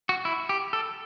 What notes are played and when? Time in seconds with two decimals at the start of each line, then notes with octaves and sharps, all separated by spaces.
0.09 F#4
0.25 E4
0.49 G4
0.73 A4